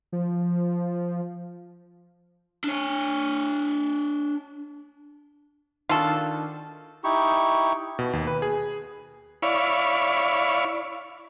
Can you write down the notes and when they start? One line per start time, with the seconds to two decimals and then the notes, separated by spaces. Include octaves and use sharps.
0.12 F3
2.64 D4 C#5
5.89 D#3 D4 F4 F#4 A4
7.04 D#4 E4 G4 C#6
7.99 B2
8.13 D#2
8.27 B4
8.42 G#4
9.42 E4 C#5 D5 F5 B5 C#6